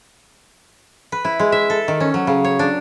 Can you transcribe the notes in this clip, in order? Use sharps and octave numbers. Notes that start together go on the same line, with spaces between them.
B4
E4
G#3
E5
A4
D#3
C#4
F#3
C#3
C#5
D4